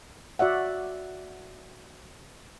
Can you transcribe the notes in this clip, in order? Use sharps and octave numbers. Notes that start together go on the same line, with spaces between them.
F#4 D5 E5 F#5